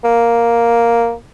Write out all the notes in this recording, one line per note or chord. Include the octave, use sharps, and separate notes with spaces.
A#3